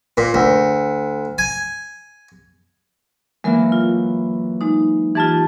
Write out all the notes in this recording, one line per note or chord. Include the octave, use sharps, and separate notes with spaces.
A#2
D2
G#5
E3 F#3 G#3 A#3 A#4 E5
F4
G#3 D#4
E3 F4 G4 A5 D#6